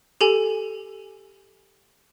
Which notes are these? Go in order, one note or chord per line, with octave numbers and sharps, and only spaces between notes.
G4 A4 G#5